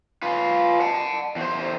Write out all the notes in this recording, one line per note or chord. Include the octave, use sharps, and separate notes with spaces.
F4 B4
F#5 A5
E2 C5